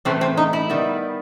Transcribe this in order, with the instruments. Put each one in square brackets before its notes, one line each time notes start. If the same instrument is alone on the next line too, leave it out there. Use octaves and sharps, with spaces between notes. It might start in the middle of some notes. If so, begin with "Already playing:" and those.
[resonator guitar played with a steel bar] A2 E3 A3 C4
C4
D#4
E4
D#3 G3 B3